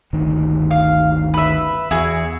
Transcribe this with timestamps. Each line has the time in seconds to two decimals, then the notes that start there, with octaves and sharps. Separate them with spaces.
0.13 G1 D2 D#3
0.71 F5
1.34 B4 E5
1.91 E2 E4 F#4 G#4